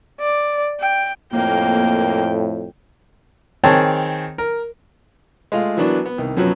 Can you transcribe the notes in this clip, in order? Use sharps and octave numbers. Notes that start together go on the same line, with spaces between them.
D5
G5
F2 A2 A#3 G5
D#3 C4 G#4 C#5 A5
A#4
G#3 A3 F4 F5
E3 F#3 A#3 B3 D4 F#4
B3
C2 D#3
F#2 F3 F#3 B3 C#4